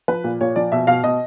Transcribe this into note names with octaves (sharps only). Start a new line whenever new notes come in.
F3 B4
A#2
A#2 C#5
F3 D5
B2 E5
B2 F5
B2 D#5